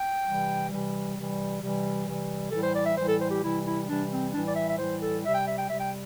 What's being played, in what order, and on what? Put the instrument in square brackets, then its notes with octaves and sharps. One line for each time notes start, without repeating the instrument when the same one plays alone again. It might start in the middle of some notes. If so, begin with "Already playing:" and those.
Already playing: [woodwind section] G5
C3 E3 G3
C3 E3 G3
C3 E3 G3
C3 E3 G3
C3 E3 G3
A2 E3 G3 A4
C5
D5
E5
A2 E3 G3 C5
A4
C5
G4
C3 E3 G3 E4
E4
C3 E3 G3 D4
C4
A2 E3 G3 D4
D5
E5
E5
A2 E3 G3 C5
A4
C3 G3 E5
G5
E5
G5
C3 G3 E5
G5